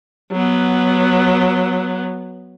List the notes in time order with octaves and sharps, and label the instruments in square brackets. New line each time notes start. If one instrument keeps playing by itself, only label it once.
[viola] F#3 B3